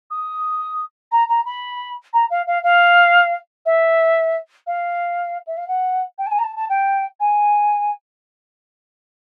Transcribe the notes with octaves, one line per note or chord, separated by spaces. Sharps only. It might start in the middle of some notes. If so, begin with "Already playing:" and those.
D#6
A#5
A#5
B5
A#5
F5
F5
F5
E5
F5
E5
F5
F#5
G5
A5
G#5
A#5
A5
A5
G5
G#5